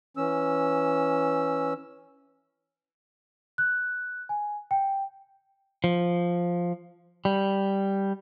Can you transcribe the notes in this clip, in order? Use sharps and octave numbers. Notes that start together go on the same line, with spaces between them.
E3 C#4 E6
F#6
G#5
G5
F3
G3